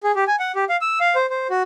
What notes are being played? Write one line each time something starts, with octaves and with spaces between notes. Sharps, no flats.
G#4
G4
G#5
F#5
G4
F5
E6
F5
C5
C5
F#4